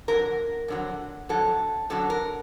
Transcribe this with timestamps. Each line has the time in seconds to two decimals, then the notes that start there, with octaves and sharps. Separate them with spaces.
0.08 F2 D3 F#3 A#4
0.68 F2 D3 F#3
1.29 F2 D3 F#3 A4
1.90 F#2 D3 F#3 A4
2.10 A#4